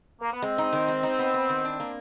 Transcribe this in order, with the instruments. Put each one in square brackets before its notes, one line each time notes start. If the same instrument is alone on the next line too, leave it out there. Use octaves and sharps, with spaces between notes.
[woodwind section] A#3
B3
[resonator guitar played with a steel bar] G#3 [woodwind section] C4
[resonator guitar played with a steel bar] D#4
D#3
G#3
D#4
B3
B3
D#3
D4
A#3